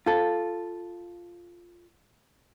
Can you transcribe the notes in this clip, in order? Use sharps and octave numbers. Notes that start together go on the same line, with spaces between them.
F4 A4